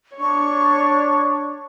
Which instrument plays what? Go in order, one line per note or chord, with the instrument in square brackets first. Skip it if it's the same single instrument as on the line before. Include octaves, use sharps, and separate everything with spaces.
[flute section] D4 C#6 [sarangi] C#5